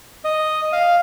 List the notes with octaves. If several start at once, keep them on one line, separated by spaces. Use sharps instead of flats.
D#5
F5